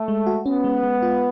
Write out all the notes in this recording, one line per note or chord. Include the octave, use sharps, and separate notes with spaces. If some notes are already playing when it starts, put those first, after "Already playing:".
Already playing: A3
G#3
F#4
B3 C#4
G#3
G#3
F4